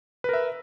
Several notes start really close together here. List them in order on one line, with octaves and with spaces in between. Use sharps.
B4 A#4 E5